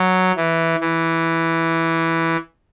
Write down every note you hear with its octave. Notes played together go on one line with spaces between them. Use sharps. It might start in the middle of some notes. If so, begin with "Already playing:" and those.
Already playing: F#3
E3
E3